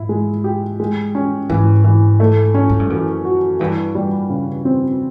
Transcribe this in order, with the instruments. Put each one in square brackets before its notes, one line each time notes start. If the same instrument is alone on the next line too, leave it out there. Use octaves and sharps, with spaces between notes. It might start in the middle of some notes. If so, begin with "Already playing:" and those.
Already playing: [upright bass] G#2 [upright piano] E4
[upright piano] G#3
G4
G#3
C#4
[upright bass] G#2 [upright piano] E3
[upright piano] E3
A3
C#4
[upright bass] G#2
G2
[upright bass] F#2 [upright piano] E3
[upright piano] F#4
[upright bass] G2 [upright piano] E3
[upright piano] G3
C#3
C4